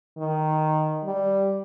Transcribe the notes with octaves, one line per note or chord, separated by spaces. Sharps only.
D#3
G3